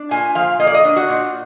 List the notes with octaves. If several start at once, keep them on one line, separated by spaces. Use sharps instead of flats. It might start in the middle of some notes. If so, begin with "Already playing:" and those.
Already playing: D4
A#2 G#5
F3 F5
A#3 D#5
D5
D#5
D4
F#4
A#2